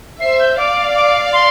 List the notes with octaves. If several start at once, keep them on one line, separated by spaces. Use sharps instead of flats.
C5 E5 C7
G6
D5 F5 D6
D6
C6